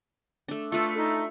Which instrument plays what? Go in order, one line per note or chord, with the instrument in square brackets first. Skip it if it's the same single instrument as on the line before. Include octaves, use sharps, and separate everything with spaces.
[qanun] A3 D4
[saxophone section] A3 [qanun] F4 B4 [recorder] A4
[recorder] D#4